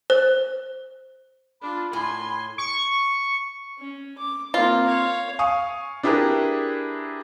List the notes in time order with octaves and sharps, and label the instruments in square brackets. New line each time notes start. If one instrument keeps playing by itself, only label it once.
[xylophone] C5
[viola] D4 F4 [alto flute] B5
[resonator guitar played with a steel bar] A2 [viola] G#5 C6
[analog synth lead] C#6
[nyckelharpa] C#4
D6
[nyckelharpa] A#3 C4 [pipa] F4
[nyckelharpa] C#5 F5
[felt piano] F5 G#5 C#6 D#6
D4 E4 G4 G#4 A#4 B4